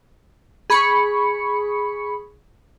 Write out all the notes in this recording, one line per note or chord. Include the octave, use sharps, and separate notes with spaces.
G#4 B5 C#6 C#7